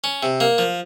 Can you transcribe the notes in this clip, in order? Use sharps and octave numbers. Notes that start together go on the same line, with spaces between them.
C#4
C3
A#3
F3